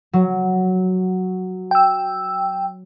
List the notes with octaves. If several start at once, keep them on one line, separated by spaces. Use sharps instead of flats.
F#3
G5 E6